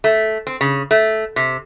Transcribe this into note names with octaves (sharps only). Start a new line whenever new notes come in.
A3
C4
C#3
A3
C3